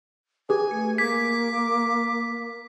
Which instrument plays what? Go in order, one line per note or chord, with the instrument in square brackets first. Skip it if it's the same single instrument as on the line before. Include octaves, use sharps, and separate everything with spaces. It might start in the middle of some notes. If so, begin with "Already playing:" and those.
[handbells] G4 G#4 B4 [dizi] G#5
[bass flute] A3 [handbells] C#7
[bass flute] A#3 [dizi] D6 [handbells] G#6 [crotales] B6